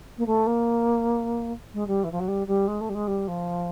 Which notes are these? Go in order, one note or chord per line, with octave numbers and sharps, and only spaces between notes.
A#3
A3
A#3
G#3
G3
E3
F3
F#3
G3
G3
G#3
A3
G3
G#3
G3
F3